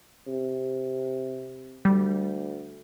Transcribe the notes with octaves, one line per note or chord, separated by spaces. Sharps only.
C3
D2 G3